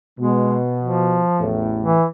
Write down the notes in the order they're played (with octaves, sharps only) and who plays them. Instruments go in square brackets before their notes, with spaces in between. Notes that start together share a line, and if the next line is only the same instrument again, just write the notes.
[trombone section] B2 [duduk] G#3
[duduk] F3
[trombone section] A1 E2 A2
[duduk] E3